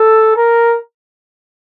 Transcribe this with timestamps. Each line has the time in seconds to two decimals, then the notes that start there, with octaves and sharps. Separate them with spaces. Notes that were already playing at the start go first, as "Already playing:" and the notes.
Already playing: A4
0.37 A#4